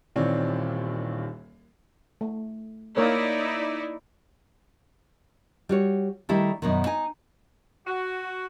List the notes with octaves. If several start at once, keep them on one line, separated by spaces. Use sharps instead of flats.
D#1 D#2 E3 C4 C#5 D5
A3
A#3 D#4 E4 A#4 C#5 D5
G3 F#4 C#5
D#3 G3 A3 E4 G4 A4
F#2 B2 D#3
D#4 G#5
F#4